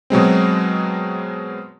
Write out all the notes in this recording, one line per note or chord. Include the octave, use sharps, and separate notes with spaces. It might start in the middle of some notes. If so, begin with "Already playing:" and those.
B2 F#3 G#3 C4